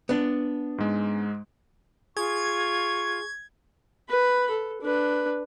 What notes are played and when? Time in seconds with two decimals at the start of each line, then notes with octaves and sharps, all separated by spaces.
0.09 B3 D4
0.78 G#2 G#3
2.17 F4 G#4 C#6 G#6
4.10 B4 B5
4.50 A4
4.81 D4 B4